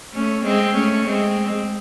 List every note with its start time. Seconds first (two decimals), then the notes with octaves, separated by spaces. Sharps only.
0.14 A3 C#4
0.44 G#3 C4
0.75 A3 C#4
1.07 G#3 C4